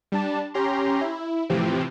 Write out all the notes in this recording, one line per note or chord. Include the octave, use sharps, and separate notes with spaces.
G3 D4 A5
C#4 G4 A#5 C6
E4
A2 C3 E3 F3 C4 G4